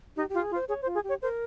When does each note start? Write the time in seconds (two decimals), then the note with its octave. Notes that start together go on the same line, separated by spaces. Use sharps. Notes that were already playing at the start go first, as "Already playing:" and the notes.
0.16 D#4 G4
0.30 G4
0.34 F4
0.42 G#4
0.51 F4
0.55 C5
0.68 G#4 C#5
0.82 C5
0.86 F4
0.95 G#4
1.04 G4
1.09 C#5
1.22 A#4 C5